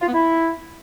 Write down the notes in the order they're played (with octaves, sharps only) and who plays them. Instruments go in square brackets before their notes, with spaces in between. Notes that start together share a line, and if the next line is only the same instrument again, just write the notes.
[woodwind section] F4
B3
E4